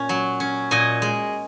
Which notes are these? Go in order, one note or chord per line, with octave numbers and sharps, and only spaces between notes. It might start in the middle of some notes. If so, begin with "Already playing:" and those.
Already playing: A#2 C#4
F#3
C#4
A#2 D#5 G#5
G#3